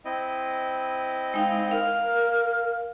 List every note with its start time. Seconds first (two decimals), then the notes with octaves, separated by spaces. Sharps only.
0.05 C4 E4 D#5
1.34 G#3 D#4 F5 G5
1.71 A#4 F5